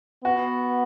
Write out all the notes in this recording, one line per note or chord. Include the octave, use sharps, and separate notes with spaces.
B3 F#4